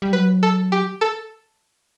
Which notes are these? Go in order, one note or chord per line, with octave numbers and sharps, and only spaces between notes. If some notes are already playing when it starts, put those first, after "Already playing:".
G3
F#3 B4
A4
G4
A4